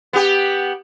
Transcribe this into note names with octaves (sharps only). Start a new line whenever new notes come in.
B3 G4